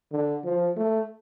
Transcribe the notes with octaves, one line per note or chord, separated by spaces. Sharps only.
D3
F3
A3